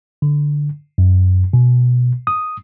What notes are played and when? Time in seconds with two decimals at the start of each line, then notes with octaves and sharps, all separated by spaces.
0.22 D3
0.98 F#2
1.53 B2
2.27 D#6